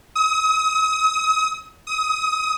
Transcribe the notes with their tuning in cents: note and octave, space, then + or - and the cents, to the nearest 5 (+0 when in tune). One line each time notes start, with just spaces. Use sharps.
D#6 +35
D#6 +25